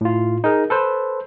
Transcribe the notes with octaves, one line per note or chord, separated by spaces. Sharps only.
A2 F4
D#4 G#4 A#4
A4 B4 C5